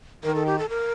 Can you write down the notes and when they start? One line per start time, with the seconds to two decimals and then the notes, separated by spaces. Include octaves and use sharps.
0.23 D#3 A#4
0.35 A4
0.46 G4
0.59 A4
0.69 A#4